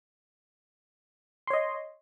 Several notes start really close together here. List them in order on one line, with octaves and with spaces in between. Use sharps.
C6 C#5 D#5